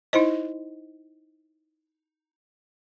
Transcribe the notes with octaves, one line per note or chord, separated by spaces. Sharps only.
D#4 E4 C5 D#5